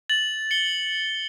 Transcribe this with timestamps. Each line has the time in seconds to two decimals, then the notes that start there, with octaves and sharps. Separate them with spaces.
0.10 A6 F#7
0.51 C#7 G7